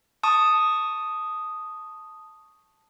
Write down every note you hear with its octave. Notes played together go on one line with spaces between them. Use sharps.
A5 C#6 D#6